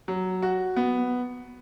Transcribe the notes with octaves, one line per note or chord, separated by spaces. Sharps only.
F#3
F#4
B3